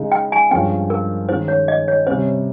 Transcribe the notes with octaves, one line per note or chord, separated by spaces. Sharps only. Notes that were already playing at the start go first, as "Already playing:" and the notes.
Already playing: C#3 G#3 D#4
G5
G#5
G2 F3 G#3 C#4 G5
A#4
D#3 G#3 C#4 C5
C#5
D#5
C#5
C3 G3 C#4 C5